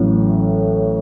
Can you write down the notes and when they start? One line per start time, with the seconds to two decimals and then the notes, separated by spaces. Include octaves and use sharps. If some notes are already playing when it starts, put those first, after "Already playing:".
Already playing: A1 A2 F#3